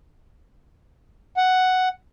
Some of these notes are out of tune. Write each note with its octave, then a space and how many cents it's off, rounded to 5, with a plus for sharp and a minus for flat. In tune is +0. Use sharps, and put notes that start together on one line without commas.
F#5 +5